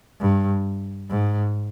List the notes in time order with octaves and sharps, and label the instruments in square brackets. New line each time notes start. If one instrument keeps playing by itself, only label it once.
[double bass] G2
G#2